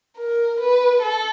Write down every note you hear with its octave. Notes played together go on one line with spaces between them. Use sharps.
A#4
B4
A4